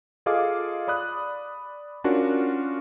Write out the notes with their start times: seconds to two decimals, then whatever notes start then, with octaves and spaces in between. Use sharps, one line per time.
0.26 F4 G#4 A4 D#5 F5 D6
0.88 D5 B5 D#6 F#6
2.04 C#4 D4 F4 F#4 A#4